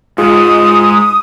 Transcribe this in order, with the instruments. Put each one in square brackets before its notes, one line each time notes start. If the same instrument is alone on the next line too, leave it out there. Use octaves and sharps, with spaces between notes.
[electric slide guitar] G#2 G#3 [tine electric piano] F4 G#4 [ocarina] D#6